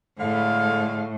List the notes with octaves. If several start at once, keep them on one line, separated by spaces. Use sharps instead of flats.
A2 D3 G#3 F5